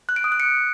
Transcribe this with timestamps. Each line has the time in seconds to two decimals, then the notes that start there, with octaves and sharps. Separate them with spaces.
0.09 F#6
0.16 D7
0.24 D#6
0.32 F#6
0.40 C#7